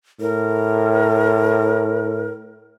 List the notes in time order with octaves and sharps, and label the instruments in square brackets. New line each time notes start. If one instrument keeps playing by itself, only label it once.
[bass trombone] A2 [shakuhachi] A#4